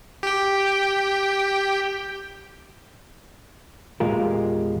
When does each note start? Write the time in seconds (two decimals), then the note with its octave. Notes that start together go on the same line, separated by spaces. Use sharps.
0.23 G4 G5
4.00 E2 A#2 G#3 F4 G4 A#4